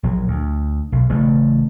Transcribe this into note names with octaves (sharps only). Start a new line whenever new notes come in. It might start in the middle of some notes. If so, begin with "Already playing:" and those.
A#1 F#3
D2
B1
A1 C#3 E3 A3